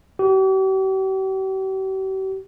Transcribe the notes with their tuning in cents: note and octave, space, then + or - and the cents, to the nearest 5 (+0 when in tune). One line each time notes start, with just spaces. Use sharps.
G4 -45